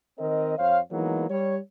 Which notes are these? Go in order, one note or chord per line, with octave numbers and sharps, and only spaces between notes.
D#3 C4 A#4 D#5
F2 C5 C#5 F5
E3 F#3 G#3 A#3 B3 D#4
G3 C#5